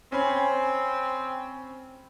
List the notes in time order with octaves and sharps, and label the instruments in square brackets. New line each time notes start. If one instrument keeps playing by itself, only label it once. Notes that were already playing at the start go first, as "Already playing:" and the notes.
[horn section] C4 [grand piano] C#4 [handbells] G#5 B5